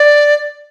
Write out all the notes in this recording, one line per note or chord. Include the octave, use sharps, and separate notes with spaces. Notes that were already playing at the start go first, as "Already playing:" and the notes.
Already playing: D5